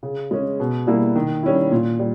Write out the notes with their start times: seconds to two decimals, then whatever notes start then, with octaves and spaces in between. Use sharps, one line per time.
0.03 C#3
0.31 G#3 C#4
0.60 B2
0.87 G3 A#3 E4
1.15 D#3
1.43 G3 C#4 E4
1.71 A#2
1.99 G3